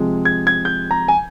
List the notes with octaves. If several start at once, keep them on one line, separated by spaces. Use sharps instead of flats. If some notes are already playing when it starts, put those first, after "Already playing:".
Already playing: C3 F3 G#3
G#6
G#6
G6
A#5
G#5